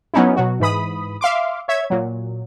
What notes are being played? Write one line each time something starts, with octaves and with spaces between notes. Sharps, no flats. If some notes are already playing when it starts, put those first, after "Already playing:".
F#3 B3 C#4 D#4 E4
B2 F#3 F#4
G#2 E3 B5 D#6
E5 F5 C6 D6
C#5 E5 G#6
A#2 F#3